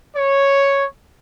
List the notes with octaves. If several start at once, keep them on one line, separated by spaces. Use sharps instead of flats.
C#5